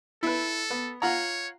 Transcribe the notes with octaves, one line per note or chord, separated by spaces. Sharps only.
E4 A4 B4
B3
F4 C#5 F#5 A#5